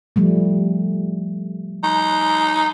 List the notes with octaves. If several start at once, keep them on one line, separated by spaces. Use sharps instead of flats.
F3 G3 A3
D#4